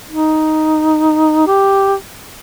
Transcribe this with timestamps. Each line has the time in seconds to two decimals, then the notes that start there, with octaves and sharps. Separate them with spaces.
0.11 D#4
1.47 G4